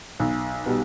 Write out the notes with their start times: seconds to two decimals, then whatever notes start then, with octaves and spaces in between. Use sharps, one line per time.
0.20 B1
0.66 B2 G3